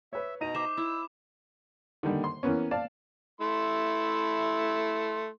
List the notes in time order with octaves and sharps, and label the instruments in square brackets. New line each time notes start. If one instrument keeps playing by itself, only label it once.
[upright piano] B4 C#5 [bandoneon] E5
[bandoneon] B2 A#5 [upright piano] D#4 D#7
[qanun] C5 E5 [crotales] D6 E7
[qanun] E4 [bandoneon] E6
[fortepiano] D3 D#3 G3
C6
E3 A#3 B3 C#4
D5 F5 A5
[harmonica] A3 E4 C6